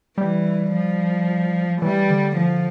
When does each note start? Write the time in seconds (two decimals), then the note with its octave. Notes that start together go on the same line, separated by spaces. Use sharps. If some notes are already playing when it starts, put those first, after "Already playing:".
0.18 E3 G3
0.73 F3
1.82 E3 G3
2.09 D3
2.36 F3